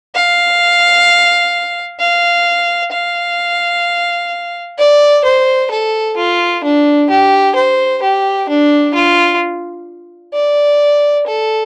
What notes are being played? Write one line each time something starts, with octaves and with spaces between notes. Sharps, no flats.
F5
F5
F5
D5
C5
A4
F4
D4
G4
C5
G4
D4
F4
D5
A4